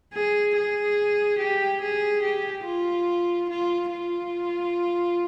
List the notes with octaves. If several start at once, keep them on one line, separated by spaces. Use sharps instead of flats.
G#4
G#4
G4
G#4
G4
F4
F4
F4